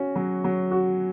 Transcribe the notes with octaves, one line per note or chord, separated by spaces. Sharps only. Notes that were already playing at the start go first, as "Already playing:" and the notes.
Already playing: C#4 F#4
F#3
F#3
F#4